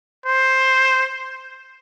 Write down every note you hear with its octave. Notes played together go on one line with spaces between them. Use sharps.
C5